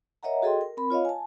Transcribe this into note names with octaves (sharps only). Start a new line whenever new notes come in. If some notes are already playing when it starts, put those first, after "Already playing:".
A#4 C#5 D#5 E5 F#5 A#5
F#4 G#4 A4 D#5 G5 C6
A#4
C4 A#4 B5
F4 C#5 D#5 F5
G#5 A5